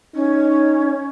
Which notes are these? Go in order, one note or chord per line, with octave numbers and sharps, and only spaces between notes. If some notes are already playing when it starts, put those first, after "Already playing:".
C#4 D#4